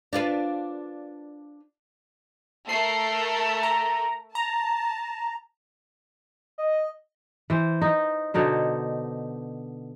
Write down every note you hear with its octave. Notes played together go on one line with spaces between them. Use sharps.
D4 F4 B4
A3 A#4 C7
A#5
A5 A#5
D#5
E3 C5
D#4
B2 D3 D#4 C5